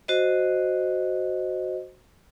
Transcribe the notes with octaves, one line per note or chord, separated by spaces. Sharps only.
F#4 C5 D#5